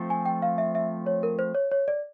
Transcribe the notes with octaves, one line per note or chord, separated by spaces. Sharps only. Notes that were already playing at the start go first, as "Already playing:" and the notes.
Already playing: F3 A3 C4 F4 A4
G#5
G5
F5
E5
E5
C#5
A#4
C5
C#5
C#5
D5